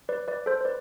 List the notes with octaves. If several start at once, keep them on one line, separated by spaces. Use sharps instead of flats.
B4 D5
B4 D5
A4 C5
C5
B4 D5